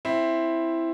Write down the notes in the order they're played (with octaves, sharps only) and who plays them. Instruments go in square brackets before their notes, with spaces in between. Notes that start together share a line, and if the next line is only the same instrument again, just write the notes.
[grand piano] C4 E4